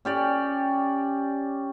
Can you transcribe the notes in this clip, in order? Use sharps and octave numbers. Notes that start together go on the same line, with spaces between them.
C#4 G4 D5